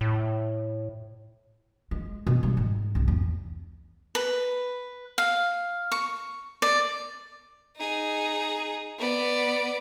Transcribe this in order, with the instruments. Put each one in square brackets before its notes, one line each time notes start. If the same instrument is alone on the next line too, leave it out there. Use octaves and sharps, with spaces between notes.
[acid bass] A2
[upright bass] G#3
B2
G3
G#2
C2
E2
[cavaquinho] B4
F5
C#6
D5
[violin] D#4 G#4
B3 D5